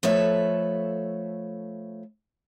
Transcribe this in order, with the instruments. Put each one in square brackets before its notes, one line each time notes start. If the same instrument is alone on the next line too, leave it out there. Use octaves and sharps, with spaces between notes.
[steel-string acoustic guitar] F3 A3 A4 B4 C#5 E5